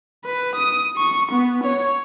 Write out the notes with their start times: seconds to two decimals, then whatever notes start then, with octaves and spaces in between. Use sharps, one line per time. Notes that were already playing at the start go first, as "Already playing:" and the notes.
0.25 B4
0.55 D#6
0.97 C#6
1.31 B3
1.63 C#5